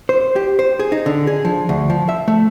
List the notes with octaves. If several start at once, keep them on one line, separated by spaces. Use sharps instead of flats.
C5
G4
C5
G#4
D#4
D3
G#4
F3
D2
F3
E5
A3